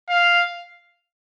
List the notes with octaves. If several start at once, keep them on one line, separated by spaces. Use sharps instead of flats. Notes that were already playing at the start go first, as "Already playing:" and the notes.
F5